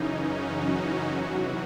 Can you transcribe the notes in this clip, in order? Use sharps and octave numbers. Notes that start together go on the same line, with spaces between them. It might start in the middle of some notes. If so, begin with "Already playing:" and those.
Already playing: F#2 C#3 E3 C#4 D#4
F#3 F#4
F#3 F#4
E2 C3 E3